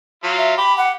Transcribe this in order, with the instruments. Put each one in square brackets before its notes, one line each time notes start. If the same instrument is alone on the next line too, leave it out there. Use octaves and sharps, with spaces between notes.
[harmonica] F#3 F4
[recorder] E5
[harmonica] G4 [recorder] B5
[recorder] F#5